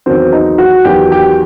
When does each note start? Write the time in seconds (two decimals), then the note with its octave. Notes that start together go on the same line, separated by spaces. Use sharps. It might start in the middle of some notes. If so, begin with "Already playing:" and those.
0.06 E2 D#3 F#3 C4
0.32 D#4
0.58 F#4
0.85 E2 D#3 F#3 G4
1.12 G4